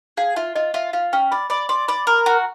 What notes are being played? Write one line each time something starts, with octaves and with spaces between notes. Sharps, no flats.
G#4 F5
F4 E5
F4 D#5
F4 E5
F4 F5
C#4 G5
D5 B5
D5 B5
D5 C6
D5 B5
A#4
F#4